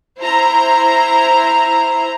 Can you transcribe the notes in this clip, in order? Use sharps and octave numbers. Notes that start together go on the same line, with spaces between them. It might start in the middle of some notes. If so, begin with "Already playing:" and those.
E4 C5 A#5